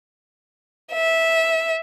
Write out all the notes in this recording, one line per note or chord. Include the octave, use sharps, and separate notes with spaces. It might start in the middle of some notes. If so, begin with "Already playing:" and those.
E5